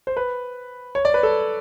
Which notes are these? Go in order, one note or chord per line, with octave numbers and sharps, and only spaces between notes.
C5
B4
C#5
D5
B4
A4